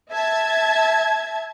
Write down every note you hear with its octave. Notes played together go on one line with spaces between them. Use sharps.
E5 A5 G#6